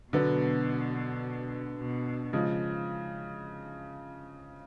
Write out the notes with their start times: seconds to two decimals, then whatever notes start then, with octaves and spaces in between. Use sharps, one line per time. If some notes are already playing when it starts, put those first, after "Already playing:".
0.12 B2 D3 F#3 B3
1.78 B2
2.33 C#3 F3 G#3